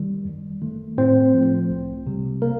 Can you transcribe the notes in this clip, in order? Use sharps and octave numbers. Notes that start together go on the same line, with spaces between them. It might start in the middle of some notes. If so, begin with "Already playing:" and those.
Already playing: D#3 G3
F2
D#3 A3
A2 C4 C5
F3 A3
C2
C3 G3
A#3 A#4